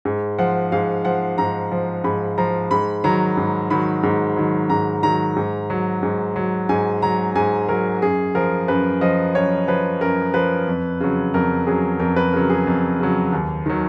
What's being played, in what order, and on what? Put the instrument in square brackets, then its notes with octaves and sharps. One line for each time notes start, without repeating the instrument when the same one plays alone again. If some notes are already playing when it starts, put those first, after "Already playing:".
[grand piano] G#2
F3 F#5
G#2 F5
F3 F#5
G#2 A#5
F3
G#2 B5
F3 A#5
G#2 B5
D#3 F#3 A#5
G#2
D#3 F#3 B5
G#2
D#3 F#3
G#2 A#5
D#3 F#3 A#5
G#2
F#3
G#2
F#3
G#2 G#5
F#3 A#5
G#2 G#5
F#3 A#4
F#2 G#4
F3 A#4
F#2 B4
F3 D#5
F#2 C#5
F3 B4
F#2 A#4
F3 B4
F2
C#3 F#3
F2 A#4
C#3 F#3 G#4
F2 A#4
B4
C#3 F#3 A#4
G#4
F2
C#3 F#3
D#2
D#3 F#3